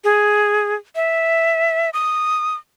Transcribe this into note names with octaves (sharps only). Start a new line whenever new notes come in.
G#4
E5
D#6